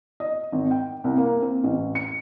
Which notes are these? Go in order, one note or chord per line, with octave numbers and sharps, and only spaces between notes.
D#5
G#1
G5
C2
A#3
C4
A1
C#7